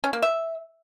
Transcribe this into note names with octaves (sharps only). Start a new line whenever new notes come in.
C#4
A#3
E5